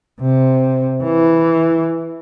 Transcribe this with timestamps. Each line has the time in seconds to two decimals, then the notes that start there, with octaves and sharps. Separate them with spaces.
0.20 C3
1.03 E3